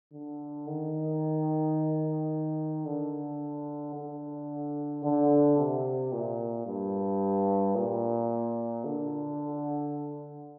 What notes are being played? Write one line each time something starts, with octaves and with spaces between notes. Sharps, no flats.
D3
D#3
D3
D3
D3
C3
A#2
G2
A#2
D3